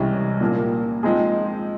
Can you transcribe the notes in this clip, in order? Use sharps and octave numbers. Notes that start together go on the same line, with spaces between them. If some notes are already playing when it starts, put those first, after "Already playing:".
Already playing: C2 C3 E3 G#3 C#4
A#2 F3 A#3
F3 G#3 C4 D#4 G#4